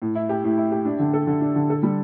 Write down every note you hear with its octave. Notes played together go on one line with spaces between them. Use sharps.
A2
E4
G4
A2
E4
G4
D4
D3
A4
D3
D4
D3
A4
G3